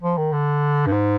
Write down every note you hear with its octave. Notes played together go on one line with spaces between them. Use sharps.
F3
D#3
D3
G2
G#2